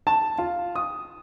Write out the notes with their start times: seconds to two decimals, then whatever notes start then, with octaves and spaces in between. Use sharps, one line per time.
0.07 A5
0.38 F4
0.75 D#6